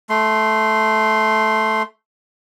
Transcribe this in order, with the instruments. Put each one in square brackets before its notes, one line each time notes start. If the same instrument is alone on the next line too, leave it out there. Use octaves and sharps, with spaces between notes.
[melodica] A3 C6